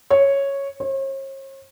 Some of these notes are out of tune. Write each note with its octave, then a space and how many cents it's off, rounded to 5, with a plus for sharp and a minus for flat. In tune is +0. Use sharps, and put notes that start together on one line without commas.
C#5 -5
C#5 -45